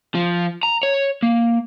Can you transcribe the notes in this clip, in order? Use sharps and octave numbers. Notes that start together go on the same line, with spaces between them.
F3
A#5
C#5
A#3